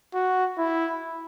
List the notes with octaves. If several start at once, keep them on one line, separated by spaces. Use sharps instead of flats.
F#4
E4